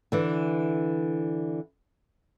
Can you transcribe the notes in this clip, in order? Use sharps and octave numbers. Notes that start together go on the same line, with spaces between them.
D3 E3